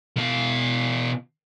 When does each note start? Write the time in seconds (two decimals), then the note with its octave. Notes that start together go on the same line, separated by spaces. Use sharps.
0.17 B2 F5